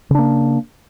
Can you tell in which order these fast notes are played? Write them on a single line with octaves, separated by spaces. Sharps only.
C#3 D4 A#3